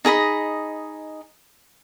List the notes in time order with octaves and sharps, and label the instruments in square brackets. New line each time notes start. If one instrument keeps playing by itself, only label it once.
[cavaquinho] D#4 G#4 D#5 B5